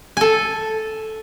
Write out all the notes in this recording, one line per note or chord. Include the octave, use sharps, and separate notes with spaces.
A4 G#5